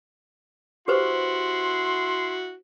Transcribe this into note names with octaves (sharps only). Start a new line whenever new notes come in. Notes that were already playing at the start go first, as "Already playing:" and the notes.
E4 F#4 G4 B4 C5 C6